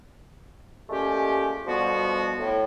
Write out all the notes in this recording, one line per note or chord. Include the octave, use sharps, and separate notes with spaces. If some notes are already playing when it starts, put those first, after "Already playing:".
A#2 G#3 A3 C#4 G4
B2 D3 F3 G3 B3 F#4
A2